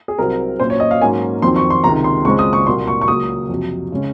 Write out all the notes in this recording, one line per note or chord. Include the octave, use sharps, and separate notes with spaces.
G#4
C2 C3 F#3 C4 A#4
A#2 F#3 C#4 C5
C#5
D#5
F5
G#2 F#3 A#3 C#4 G#5
F2 D#3 F#3 C4 C6
C#6
C6
C#2 C3 D#3 A#5
C6
C#2 C#3 G#3 C4 C#6
D#6
C#6
C2 A#2 F#3 A#3 C6
C#6
C#6
C#2 C#3 F#3 A#3 D#6
F2 C3 F#3
C#3 G#3 C#4